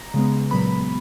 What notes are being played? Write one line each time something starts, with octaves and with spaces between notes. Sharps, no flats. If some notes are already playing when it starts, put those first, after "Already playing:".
Already playing: A#5
C#3 G#3 B3
A#2 F#3 B3 B5